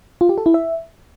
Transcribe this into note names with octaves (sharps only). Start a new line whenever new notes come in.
F4
G4
A4
E4
E5